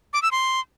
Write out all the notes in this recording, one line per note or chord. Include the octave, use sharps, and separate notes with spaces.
D6
E6
C6